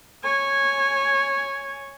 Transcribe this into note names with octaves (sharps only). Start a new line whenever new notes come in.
C#5 G#5